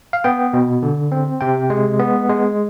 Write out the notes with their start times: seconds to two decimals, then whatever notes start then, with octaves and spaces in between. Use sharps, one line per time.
0.13 F5
0.24 B3 G5
0.53 B2
0.83 D3
1.12 C4
1.41 C3 G5
1.70 G#3
1.99 B3
2.29 G#3